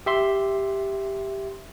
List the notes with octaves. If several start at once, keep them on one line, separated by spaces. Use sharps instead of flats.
G4 E5 C6